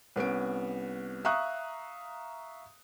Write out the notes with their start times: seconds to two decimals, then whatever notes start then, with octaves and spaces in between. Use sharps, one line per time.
0.16 C2 B3 C#4 D7
1.25 E5 F5 A#5 C#6 D#6 F#6